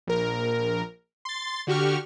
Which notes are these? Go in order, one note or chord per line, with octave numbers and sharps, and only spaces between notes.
A#1 A#4
C6 A6
D3 F#4 G4 C#6 F6